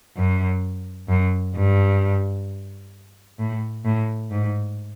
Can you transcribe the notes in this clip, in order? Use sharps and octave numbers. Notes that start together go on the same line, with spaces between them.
F#2
F#2
G2
A2
A2
G#2